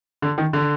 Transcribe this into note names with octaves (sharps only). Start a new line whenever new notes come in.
D3
D#3
D3